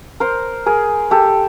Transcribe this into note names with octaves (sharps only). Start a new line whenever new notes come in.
A#4 C5
G#4 A#4
G4 A4